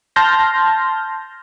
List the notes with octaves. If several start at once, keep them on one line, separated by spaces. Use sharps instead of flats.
A5 C6 F6 G6 A#6